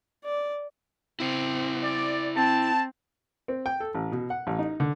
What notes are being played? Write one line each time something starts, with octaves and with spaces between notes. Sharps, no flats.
D5
C4 E4 C5
D5
C4 A5
C4
G5
A4
A1
B2
F#5
A1
D#4
D3